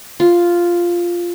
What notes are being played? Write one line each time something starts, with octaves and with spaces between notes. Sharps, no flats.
F4